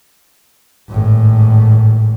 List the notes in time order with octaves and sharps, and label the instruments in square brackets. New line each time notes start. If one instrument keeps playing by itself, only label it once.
[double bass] G#1 A2